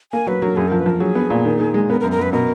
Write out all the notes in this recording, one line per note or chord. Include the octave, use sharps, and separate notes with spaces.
A#3 G#5
F#3 B4
F#3 A#4
F#2 G#4
F3 A#4
B4
F3 A#4
F#3 G#4
B3
A#2
D#3
D#3
G#3
B3 A#4
A#4
F#2
A#4
F#2 B4
B2 A#4